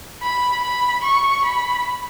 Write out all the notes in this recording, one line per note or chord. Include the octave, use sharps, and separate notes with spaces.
B5
B5
C#6
B5